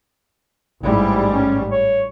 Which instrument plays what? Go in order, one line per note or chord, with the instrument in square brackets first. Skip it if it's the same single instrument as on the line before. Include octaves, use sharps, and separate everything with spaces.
[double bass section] A1 G#2 G3 [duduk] E4
[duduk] C#4
C#5